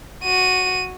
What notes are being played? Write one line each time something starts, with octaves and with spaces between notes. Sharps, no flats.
F#4 D#7